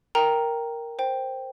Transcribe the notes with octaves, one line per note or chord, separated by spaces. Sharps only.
A#4 G5 A#5
C5 G5